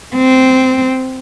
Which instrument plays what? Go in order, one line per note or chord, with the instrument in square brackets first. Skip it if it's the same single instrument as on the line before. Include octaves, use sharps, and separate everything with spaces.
[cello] C4